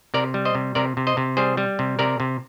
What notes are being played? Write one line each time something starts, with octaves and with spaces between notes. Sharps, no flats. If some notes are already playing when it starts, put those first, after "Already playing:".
C3 A#4 D5
G3
C5 D#5
C3
C3 A#4 D5
C3
C5 D#5
C3
G3 G#4 C5
G3
C3
C3 A#4 D5
C3